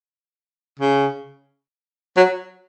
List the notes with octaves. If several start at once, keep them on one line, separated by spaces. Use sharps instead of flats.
C#3
F#3